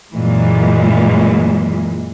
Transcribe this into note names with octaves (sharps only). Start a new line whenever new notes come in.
F#2 A#2 E3 G#3